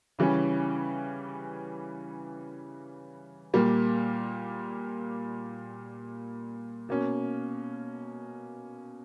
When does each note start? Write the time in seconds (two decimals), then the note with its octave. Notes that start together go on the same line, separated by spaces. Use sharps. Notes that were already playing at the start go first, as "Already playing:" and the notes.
0.19 C#3 E3 G3 C#4
3.54 A#2 G3 A#3
6.89 B2 A#3 C#4